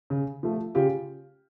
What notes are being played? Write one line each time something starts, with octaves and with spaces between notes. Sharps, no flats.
C#3
F3 A3
C#3 F4 G4